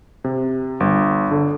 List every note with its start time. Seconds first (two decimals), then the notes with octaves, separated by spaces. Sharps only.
0.24 C3
0.80 G1
1.31 D3